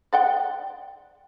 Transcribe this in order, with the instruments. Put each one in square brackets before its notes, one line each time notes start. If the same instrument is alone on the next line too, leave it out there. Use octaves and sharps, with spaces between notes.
[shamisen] D5 F#5 G5